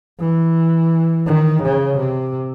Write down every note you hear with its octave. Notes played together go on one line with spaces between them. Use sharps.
E3
D#3
C#3
C3